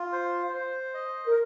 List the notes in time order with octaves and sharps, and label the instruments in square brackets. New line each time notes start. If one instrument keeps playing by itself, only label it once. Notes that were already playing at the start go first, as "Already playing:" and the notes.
Already playing: [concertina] F4
C5
C5
D#5
[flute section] A#4